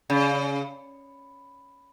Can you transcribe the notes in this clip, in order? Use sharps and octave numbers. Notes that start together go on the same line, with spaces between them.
C#3